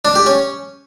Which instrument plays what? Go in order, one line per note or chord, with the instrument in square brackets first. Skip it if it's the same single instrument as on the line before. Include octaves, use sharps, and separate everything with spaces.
[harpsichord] D4
G4
C#4